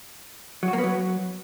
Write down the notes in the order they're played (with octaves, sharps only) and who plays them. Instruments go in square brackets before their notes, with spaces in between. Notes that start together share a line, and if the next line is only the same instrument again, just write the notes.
[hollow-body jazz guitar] F#3
F#4
A#3
B3
F#3